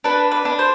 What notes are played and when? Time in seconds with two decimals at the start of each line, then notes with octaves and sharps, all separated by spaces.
0.04 D4 B4
0.31 B4
0.45 D4
0.59 C5